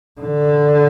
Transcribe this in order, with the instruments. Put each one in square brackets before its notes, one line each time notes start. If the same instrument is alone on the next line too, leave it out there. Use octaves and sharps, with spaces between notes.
[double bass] D3